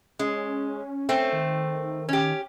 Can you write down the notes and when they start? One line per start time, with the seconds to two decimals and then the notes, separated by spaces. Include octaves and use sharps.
0.19 G#3 C#4
1.09 A3 C4
1.33 D#3
2.09 C#4 G4